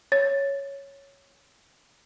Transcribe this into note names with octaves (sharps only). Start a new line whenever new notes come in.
C#5 A6